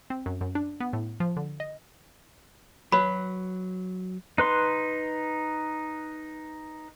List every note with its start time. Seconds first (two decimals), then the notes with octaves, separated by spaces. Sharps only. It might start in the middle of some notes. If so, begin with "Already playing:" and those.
0.10 C4
0.26 F#2
0.41 F#2
0.55 D4
0.80 B3
0.93 A2
1.20 F3
1.37 D3
1.60 D#5
2.92 F#3 B4 B5
4.38 D#4 B4 C6